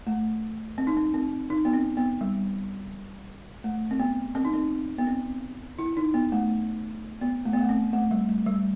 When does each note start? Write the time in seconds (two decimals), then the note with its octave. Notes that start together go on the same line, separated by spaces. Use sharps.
0.07 A3
0.78 C4
0.87 D#4
0.97 C4
1.14 C4
1.50 D#4
1.65 B3
1.73 C4
1.97 B3
2.21 G3
3.64 A3
3.91 C4
4.00 B3
4.35 C4
4.45 D#4
4.54 C4
4.98 B3
5.07 C4
5.79 E4
5.97 D#4
6.14 B3
6.32 A3
7.21 B3
7.45 A3
7.53 B3
7.61 A3
7.69 C4
7.93 A3
8.11 G3
8.29 A3
8.46 G3